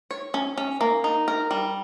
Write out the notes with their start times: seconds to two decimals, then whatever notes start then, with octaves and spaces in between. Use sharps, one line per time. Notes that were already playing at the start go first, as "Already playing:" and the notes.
0.11 C#5
0.34 C#4
0.57 C#4
0.81 A#3
1.04 D#4
1.28 A#4
1.51 G3